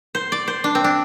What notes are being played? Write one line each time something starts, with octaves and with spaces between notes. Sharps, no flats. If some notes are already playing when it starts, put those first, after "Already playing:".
C5
D5
C5
D4
C4
D4